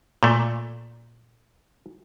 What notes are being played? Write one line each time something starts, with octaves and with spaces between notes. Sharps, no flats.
A#2 A3